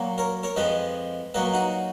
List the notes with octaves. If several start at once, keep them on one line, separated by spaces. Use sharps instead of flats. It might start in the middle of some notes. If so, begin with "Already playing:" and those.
Already playing: A#2 F#3 A#3
A#4 C#5
A#4 C#5
F2 F3 G#3 B4 D#5
A#2 F#3 A#3 B4 D#5
D#4 F#4